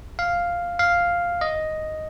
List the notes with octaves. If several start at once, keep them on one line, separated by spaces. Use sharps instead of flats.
F5
F5
D#5